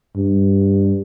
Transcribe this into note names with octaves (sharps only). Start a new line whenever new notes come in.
G2